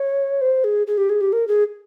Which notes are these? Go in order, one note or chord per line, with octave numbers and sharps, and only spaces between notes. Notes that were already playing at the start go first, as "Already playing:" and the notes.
Already playing: C#5
C5
G#4
G#4
G4
G#4
G4
A#4
G#4